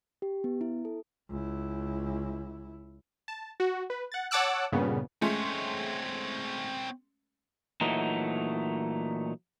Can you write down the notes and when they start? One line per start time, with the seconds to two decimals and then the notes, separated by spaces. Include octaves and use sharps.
0.22 G4
0.44 B3
0.61 E4
0.85 A4
1.29 C#2 E4
3.28 A5
3.60 F#4
3.90 B4
4.12 F#5 A6
4.31 C#5 F#5 A5 D6 E6 F#6
4.72 G2 A#2 C#3 B3
5.22 G#3 A3 C4 C#4 C#5
7.81 A#2 E3 F#3 A3 D#4